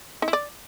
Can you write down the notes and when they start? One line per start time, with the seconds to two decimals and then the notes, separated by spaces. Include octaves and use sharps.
0.22 D#4
0.28 E4
0.33 D5